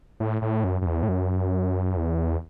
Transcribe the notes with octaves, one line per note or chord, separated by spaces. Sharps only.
A2
A2
F#2
F#2
E2
A2
F#2
E2